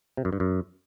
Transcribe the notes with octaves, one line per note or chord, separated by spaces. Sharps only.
C3
F#2
G2
F#2